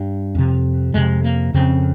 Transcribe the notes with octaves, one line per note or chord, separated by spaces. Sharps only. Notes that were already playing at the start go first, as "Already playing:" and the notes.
Already playing: G2 G3
F2 C3
F2 C3 G#3
A#3
F2 C#3 C4